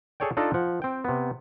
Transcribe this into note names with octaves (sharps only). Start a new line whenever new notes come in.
G#4 A4 C#5 D5 G5
D4 D#4 F4 A4 D5 D#5
F3 F#5
C4 G5
C3 B3